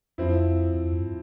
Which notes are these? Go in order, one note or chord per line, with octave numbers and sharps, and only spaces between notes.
F2 F3 C4 E4
F2
F2
G2